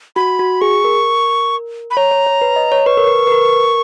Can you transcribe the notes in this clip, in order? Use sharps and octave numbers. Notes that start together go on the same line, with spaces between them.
F#4 B5
F#4
G#4 C#6
A#4
B5
C#5 A#5
C#5
C#5
B4
D#5
C#5
B4 C#6
A#4
B4
B4
A#4